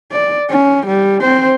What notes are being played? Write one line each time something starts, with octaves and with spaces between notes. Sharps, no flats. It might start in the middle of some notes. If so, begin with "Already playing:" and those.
D5
C#4
G3
C4 C5